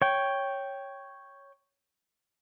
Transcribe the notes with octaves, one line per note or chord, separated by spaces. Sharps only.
C#5 G5